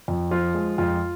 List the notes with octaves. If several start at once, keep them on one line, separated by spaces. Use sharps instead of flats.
F2
F3 F4
G#3
F2 F4